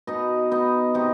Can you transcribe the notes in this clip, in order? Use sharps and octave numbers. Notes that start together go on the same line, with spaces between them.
B2 D#4 D#5
B3 D#4 D#5
C3 D#4 D#5